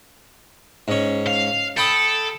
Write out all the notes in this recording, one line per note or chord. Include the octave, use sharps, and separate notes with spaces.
G#2 C#4
F5
A4 G5 B5 D#6